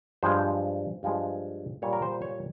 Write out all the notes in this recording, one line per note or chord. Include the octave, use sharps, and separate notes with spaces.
G2 F3 G#3 C5
G2 F3 G#3
A#2 G3 C#5
A#4
C5
C#5